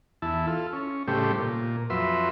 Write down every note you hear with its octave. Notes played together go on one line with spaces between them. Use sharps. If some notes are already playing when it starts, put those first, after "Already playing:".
E2 E4 A5
F4 A4
C#4
A2 C#3 G3 A3 G4 C5
A#2
F2 F#3 B4 E5 C6